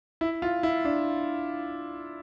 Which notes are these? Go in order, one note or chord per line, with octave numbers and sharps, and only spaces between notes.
E4
F4
E4
D4